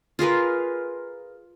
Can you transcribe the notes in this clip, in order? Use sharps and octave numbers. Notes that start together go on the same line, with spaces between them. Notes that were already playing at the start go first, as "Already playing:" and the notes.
F4 G#4 A#4 B4